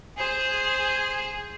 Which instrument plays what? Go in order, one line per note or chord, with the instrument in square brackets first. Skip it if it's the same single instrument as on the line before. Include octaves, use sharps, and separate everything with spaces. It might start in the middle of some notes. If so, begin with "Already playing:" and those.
[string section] G#4 [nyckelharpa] C5